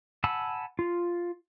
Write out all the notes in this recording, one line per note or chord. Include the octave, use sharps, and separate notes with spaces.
F#5 G#5 A5 B5 E6
F4